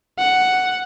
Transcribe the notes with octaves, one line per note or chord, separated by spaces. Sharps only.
F#5